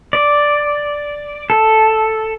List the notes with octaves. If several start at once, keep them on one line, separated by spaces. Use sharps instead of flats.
D5
A4